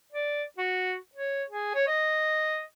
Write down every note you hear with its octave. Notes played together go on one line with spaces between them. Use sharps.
D5
F#4
C#5
G#4
C#5
D#5